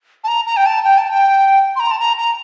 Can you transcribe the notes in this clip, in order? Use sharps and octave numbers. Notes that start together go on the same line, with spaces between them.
A5
A#5
A#5
G5
A5
G5
A5
G5
C6
A#5
A5
A#5
A#5